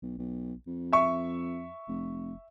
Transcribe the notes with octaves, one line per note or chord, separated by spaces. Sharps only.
B1
B1
F2
E5 C#6
F1